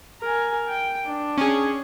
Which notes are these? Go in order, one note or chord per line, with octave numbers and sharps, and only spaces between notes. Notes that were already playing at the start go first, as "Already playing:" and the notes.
A#4 G#5
G5
D4
C#4 G#4